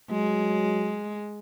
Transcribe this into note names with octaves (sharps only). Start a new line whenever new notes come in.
F#3 G#3